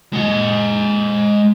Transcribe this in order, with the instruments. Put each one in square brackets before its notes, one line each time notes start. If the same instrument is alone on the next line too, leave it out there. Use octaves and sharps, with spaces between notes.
[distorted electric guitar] G#3 F#5